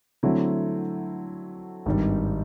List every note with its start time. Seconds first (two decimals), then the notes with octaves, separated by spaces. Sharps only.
0.23 D3 F#3 A3 C4 E4
1.86 G#1 G2 D#3 G3